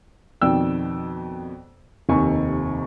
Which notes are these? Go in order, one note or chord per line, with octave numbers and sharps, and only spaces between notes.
F2 B2 D#3 D5 G5 E6
F1 D#2 C3 D#4 G#5 C#6